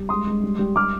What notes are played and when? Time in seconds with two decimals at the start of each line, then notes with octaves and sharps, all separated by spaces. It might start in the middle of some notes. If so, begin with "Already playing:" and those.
Already playing: G3
0.09 G#3 C6 D#6
0.27 G#3
0.43 G3
0.59 G3
0.76 G3 D6 F6